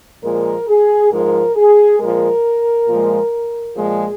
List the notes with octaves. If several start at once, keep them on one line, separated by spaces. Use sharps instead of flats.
A#2 F3 G#3 A#4
G#4
G#2 F3 G#3 A#4
G#4
A#2 F3 G#3 A#4
A#2 F3 G#3
A#2 F3 G#3 G#4